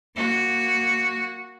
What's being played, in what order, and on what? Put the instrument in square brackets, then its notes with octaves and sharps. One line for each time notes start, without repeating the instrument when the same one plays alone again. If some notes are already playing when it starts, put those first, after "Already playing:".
[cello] A#3 F#4